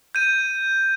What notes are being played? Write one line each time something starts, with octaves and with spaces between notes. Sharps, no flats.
G6 D#7